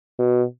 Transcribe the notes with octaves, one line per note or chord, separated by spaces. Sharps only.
B2